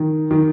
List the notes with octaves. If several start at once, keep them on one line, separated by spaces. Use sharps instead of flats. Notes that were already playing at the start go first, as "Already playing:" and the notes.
Already playing: D#3
D#3